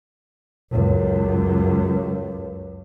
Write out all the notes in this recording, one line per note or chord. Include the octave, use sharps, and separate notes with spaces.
C#2 F#2